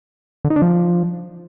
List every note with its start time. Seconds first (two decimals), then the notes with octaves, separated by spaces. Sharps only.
0.45 D3
0.50 D#4
0.56 D4
0.62 F3